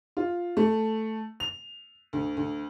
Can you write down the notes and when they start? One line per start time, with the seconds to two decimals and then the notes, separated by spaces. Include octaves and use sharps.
0.17 F4
0.57 A3
1.40 F7
2.13 D2
2.37 D2